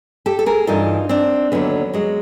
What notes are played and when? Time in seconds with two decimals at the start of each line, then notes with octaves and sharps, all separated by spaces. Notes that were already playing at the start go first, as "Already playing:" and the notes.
0.26 G4 A4
0.39 A4
0.46 G#4 A#4
0.67 G2 E3 D#4 F4
1.09 C4 D4
1.52 D#2 D3 F#3 B3 C#4
1.93 F#3 G#3